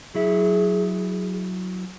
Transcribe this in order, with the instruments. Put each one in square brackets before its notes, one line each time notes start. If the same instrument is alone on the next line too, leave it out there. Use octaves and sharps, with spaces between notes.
[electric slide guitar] F#3 E4 E5 [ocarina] G#4